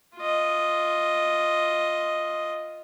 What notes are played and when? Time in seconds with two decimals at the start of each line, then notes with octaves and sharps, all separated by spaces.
0.17 F4 D#5